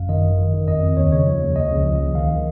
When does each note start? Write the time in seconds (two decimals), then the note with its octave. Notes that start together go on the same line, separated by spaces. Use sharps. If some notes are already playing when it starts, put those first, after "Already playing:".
Already playing: G#1 F#2 F5
0.09 D#3 D#5
0.25 G#1
0.38 D#3
0.53 D#3
0.68 F2 D#5
0.83 F2
0.97 D#2 C#5
1.12 C#3 C#5
1.27 F3
1.42 D#2
1.56 C#2 D#5
1.71 C#3
1.85 F3
2.00 C#2
2.15 D#3 F5
2.30 D#3